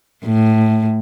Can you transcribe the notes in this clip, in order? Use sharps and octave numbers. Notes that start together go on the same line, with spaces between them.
A2